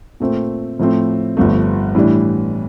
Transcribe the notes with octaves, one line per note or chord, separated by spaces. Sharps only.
A#2 A3 C4
A2 F3 A3 C4
G1 G2 F3 A3
A2 E3 G3 D4